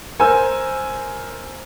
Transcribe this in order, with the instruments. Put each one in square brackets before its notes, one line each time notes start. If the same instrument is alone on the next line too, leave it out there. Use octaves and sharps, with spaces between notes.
[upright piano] A#4 C5 G#5 E6